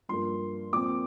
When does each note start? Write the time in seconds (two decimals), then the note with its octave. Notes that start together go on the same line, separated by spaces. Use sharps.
0.09 G2 F3 A#3 C6
0.73 A#2 F3 C4 D6